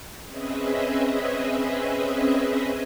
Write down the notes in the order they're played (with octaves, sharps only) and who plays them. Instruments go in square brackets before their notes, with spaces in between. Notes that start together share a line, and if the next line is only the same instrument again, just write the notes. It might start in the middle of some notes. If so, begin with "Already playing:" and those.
[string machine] C4 C#4 G#4 B4 D#5 E5